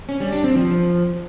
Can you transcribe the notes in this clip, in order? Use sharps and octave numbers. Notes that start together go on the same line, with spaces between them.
C#4
G3
D4
C4
F3